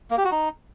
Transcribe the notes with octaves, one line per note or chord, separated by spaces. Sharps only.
A#3
G4
F#4
D#4